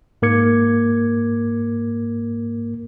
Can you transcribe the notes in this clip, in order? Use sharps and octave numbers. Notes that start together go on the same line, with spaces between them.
G#2 A#3 A#4 D6 G#6 C#7